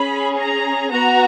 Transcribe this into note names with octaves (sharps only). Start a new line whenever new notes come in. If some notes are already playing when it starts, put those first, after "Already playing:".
Already playing: C#4 G#4 B5
A#5
B3 F#4 A#5